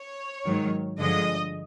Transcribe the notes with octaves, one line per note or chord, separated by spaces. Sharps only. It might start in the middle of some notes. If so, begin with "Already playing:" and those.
Already playing: C#5
G#2 D#3 F#3
G2 D3 F3 G#3 D#5